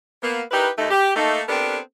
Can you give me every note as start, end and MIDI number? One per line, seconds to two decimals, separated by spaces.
0.23 0.42 58
0.23 0.42 59
0.51 0.69 63
0.51 0.69 64
0.51 0.69 67
0.51 0.69 70
0.51 0.69 71
0.78 0.87 39
0.78 0.87 57
0.78 0.87 63
0.91 1.11 67
1.16 1.41 57
1.16 1.41 58
1.16 1.41 63
1.49 1.78 59
1.49 1.78 60
1.49 1.78 62
1.49 1.78 67
1.49 1.78 69
1.49 1.78 70